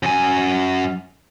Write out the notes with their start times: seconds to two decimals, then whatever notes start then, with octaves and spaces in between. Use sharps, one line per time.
0.03 F#2 G#5